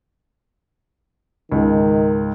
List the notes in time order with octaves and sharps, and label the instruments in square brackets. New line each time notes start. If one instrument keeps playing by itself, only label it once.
[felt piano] C#2 G#2 [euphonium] D#3